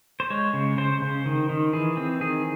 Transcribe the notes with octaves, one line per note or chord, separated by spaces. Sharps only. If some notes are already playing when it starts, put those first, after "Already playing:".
C5
G#3 C#5
C#3
C#3 C5
C#3
D#3
D#3
E3 G#4
C4
D#3 G#4